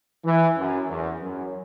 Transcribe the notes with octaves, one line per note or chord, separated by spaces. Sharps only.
E3
F#2
E2
F#2